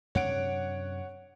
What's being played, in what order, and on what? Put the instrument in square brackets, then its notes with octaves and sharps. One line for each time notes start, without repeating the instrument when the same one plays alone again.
[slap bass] F#2 C3 D4 [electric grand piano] C#5 F#5 D7